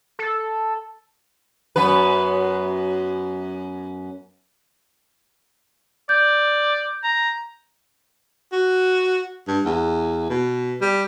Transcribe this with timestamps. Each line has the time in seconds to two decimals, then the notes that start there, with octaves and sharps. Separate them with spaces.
0.19 A4
1.76 F#2 B3 B4
6.09 D5 G6
7.04 A#5
8.52 F#4
9.48 G2
9.66 E2
10.30 B2
10.81 G3